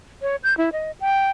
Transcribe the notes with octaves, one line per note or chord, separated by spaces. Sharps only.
C#5
G6
E4
D#5
G5